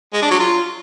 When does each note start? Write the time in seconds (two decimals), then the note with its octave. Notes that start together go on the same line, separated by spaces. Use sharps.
0.13 G#3
0.22 D4
0.31 F#3
0.40 F4